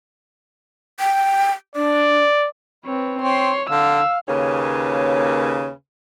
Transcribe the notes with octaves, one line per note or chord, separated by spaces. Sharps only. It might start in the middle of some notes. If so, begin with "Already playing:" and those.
G5
D4 D5
C4 B4 C#5
C4 C#5 C6
D3 F5 E6
D#2 C#3 A#3 B4 C#5